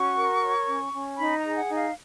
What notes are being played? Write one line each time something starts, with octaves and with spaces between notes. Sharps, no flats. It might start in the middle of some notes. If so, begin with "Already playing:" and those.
Already playing: C#4 F#4 C#6
A#4
C#5
C#4
C#4
D#4 B5
A#5
G#4
F#5
D#4
F5